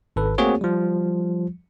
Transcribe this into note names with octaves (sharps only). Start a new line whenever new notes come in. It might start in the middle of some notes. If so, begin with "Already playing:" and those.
G#1 A4 B4
A3 A#3 C4 F#4 G#4 C#5
F3 G3